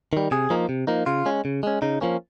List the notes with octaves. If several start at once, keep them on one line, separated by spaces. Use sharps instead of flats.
D#3 G3
C3 G#4
F3 A#3 D#4
C3
F3 A#3 D#4
C#3 F4
G#3 C#4
C#3
G#3 C#4
C#3 D#4
F3 A#3 C#4